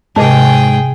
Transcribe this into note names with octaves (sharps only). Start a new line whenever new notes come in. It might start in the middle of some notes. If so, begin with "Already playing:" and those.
G#2 C3 G#4 D#5 G5 A5